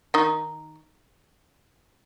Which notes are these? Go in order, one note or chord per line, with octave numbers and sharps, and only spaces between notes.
D#3 D#4